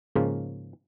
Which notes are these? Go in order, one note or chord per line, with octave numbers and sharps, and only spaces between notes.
G#2 C#3 F3 A#3 C#4 F4